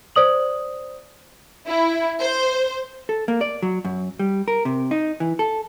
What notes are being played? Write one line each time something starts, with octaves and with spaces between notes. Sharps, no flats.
C5 D5 D#6 F#7
E4
C5
A4
A#3
D5
F#3
F#2
G3
A#4
C3
D#4
E3
A4